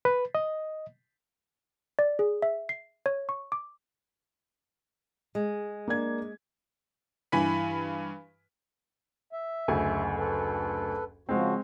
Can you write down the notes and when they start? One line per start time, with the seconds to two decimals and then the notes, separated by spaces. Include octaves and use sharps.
0.05 B4
0.35 D#5
1.99 D5
2.19 G#4
2.42 E5
2.69 C7
3.06 C#5
3.29 C#6
3.52 D6
5.35 G#3
5.88 A#3 D4 G#6
7.32 G2 E3 G#5 B5 B6
9.33 E5
9.68 F#1 D2 G#5
10.17 A4 B4
11.29 C#3 F3 G#3 C4 F#4